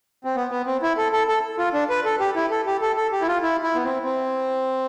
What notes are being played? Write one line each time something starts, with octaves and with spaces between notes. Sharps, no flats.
C4
B3
B3
C4
E4
A4
A4
A4
F4
D4
B4
A4
G4
E4
A4
G4
A4
A4
G4
E4
F4
E4
E4
B3
C4
C4